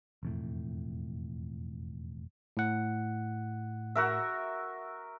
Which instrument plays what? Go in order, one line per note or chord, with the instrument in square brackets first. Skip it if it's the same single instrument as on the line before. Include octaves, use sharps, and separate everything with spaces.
[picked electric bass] E1 F2 A2
[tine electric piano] A2 F#5
[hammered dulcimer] F#4 A#4 E5